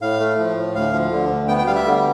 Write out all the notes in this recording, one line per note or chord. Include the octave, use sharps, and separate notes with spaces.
A2 F5
A3
F3
A2
D2 F5
F3
D3
D2
B3 G5
G5
G3 F5
E5
D3